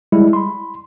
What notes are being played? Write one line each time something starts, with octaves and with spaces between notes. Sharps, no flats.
G3 G#3 E4
B5 C6